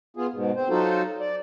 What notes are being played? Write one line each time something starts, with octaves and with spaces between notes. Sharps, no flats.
B3 F4 G#4
G#2 B2
C4 C5
F#3 D#4 F4 F#4 A4 C5
D5